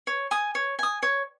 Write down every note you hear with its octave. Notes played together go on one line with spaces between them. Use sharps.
C#5
G#5 D#6
C#5
G#5 D#6
C#5